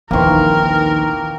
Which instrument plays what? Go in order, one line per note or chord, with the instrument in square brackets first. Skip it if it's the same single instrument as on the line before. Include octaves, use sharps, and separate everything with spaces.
[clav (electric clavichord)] A#1 E3 [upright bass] D#2 D#3 [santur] A#3 C4 C#6 [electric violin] A#4